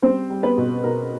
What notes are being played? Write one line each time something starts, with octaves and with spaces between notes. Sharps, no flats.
G3 C4 C5
G3
B3 B4
B2
B2 A#4